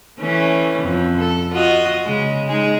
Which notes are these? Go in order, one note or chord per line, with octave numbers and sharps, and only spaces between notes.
E3 A3 C#4
F2
A4
F4 F#4 D#5
C#3 G#3
G#3 D#4 G#4